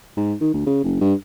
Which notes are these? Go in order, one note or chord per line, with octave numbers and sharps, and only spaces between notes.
G#2
D#3
D2
C#3
F#1
G2